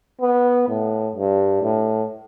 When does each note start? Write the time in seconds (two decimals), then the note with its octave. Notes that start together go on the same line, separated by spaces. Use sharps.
0.21 B3
0.68 A2
1.15 G2
1.62 A2